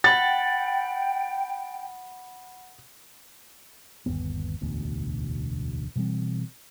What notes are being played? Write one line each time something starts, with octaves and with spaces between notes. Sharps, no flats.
F#5 G5 B5 A6
G1 D#2 B3
E1 A1 D2 B2
B2 E3 G3 C4